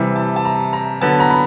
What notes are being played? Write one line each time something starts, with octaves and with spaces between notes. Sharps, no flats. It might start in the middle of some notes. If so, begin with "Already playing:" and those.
Already playing: C3 E3 G3
A5
A5
A#5
A#5
D3 F#3 B3 A5
A#5
B5